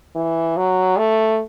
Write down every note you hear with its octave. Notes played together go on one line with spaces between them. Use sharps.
E3
F#3
A3